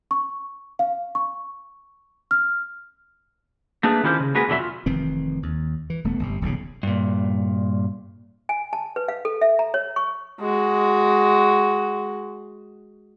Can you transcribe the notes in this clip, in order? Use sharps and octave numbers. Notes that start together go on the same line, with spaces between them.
C#6
F5
C#6
F6
A3 A#3 D4 G#4 B4
D#3 C#4 E4 F4 G4 C5
C#3
G#3 A#3 F#4 G#4 B4
E2 B2 D3 F#3 E5
F4
F1 D#3 E3 C4
D#2
E3
E1 A3 B3
G1 C3
D#1 B1 A#2 C#3
G2 A#2
G#5
A5
B4
F5
A4
E5
A#5
C#5
C#6
G#3 F#4